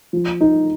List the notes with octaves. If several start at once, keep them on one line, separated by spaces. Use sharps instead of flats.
F3
D#4